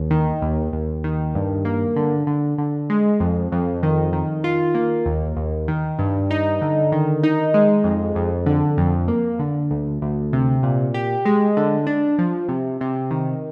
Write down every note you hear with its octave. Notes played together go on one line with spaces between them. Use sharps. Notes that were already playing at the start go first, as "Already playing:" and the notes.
Already playing: D#2
D#3
D#2
D#2
D#3
G2
A#3
D3
D3
D3
G#3
F2
F2
D#3
D#3
F4
A#3
D#2
D#2
D#3
G2
D#4
D3
D#3
D#4
G#3
F2
F2
D3
F2
A#3
D3
D2
D2
C3
A#2
G4
G#3
D3
D4
F3
C3
C3
D#3